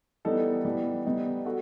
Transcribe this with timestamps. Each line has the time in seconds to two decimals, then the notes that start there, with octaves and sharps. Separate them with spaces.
0.25 E3 G3 B3 D#4 A4
0.65 E3 G3 B3
1.06 G3 B3 D#4
1.45 F#4 A4